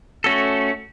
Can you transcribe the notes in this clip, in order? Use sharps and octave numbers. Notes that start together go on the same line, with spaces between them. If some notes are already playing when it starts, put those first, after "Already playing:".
A3 C#4 F#4 A4